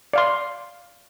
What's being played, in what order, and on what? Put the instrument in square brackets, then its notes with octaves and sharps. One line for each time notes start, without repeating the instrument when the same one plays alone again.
[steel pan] D5 F5 C6